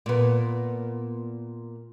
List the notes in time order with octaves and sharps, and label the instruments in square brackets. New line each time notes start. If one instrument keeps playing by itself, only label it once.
[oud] A#2 B3